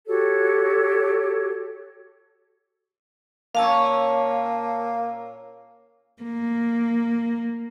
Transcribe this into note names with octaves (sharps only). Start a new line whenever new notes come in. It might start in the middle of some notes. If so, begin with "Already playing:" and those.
F#4 G4 A4 C#5
A#2 A#3 C#4 F5 A5 E6
A#3